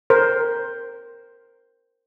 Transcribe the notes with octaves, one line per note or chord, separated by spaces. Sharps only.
A#4 C5